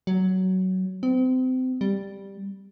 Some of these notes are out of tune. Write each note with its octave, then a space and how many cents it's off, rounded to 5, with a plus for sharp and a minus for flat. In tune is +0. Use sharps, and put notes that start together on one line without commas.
F#3 +15
C4 -30
G3 +5